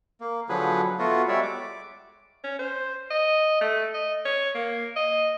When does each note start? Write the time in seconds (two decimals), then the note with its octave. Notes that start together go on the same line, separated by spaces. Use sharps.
0.20 A#3
0.49 D3 F3 F#3 G#4 B4
0.99 A3 B3 F4 F#4
1.28 G3 G#3 C#5 D5 E5
1.43 D6
2.44 C#4
2.59 C5
3.11 D#5
3.61 A3
3.94 D#5
4.25 C#5
4.55 A#3
4.96 D#5